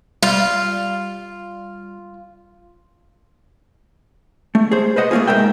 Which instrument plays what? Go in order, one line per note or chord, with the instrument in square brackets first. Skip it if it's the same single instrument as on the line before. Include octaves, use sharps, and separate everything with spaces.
[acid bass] G3 [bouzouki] F4
[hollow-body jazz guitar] A3
G#4 C5
B4 C5 D#5 F#5
A3 A#3 C#4 F4 G#4
G#2 A#4 E5 G5